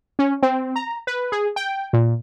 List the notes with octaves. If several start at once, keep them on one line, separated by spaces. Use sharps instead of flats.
C#4
C4
A#5
B4
G#4
G5
A#2